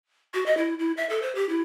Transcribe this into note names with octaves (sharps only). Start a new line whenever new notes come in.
F#4
D#5
E4
E4
E5
A4
C5
G4
E4